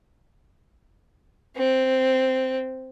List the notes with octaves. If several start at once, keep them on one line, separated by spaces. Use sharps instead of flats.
C4